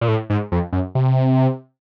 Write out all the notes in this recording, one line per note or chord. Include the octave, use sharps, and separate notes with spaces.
A#2
A2
G#2
F2
F#2
C3